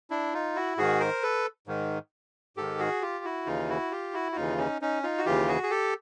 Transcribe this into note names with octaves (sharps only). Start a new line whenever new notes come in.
D4 E4
D#4 F4
E4 F#4
G#2 D#3 F#4 G#4
A#4 C5
A4 B4
G#2 D#3
G#2 D#3 G4 A4
F#4 G#4
F4 G4
E4 F#4
D#2 C#3 E3 D#4 F4
E4 F#4
F4 G4
E4 F#4
F#4
D#2 C#3 E3 D#4 F4
C#4 D#4
C#4 D#4
D#4 F4
F#4
D#2 C#3 E3 F4 G4
F#4 G#4
G#4
G4 A4